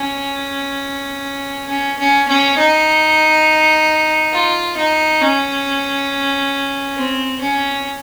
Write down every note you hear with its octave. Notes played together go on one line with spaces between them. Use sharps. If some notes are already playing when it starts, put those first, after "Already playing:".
Already playing: C#4
C#4
C#4
C#4
D#4
F4
D#4
C#4
C4
C#4